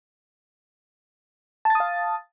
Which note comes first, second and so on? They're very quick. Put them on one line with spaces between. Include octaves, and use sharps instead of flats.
A5 A6 D#6 F5